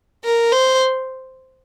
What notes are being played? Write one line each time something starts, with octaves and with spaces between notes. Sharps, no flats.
A#4
C5